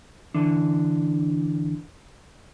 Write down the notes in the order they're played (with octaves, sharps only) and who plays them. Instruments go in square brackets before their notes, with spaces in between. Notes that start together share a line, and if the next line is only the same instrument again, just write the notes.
[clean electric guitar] D3 E3 D4